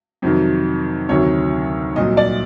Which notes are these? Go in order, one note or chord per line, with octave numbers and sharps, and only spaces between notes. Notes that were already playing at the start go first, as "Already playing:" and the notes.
F2 C3 D#3 F#3
D2 C3 D#3 F#3 C#5
C2 A#2 F#3 D#5
D5